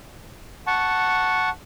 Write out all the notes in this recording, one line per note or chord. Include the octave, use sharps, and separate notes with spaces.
F#5 A5 C#6